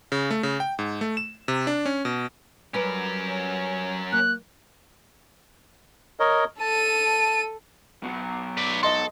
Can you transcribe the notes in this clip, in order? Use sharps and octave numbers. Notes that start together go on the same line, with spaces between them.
C#3
A3
C#3
G5
G#2
A3
E7
C3
D4
C#4
B2
F#3 G3 C#4 A#4 B4
A#3 F#6
A#4 C#5 D#5
A4 A5 D#7
B2 F#3
B4 D5
A4 D#5 C6